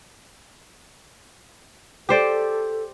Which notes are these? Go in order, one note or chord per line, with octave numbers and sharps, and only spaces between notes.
G4 A4 C5 D5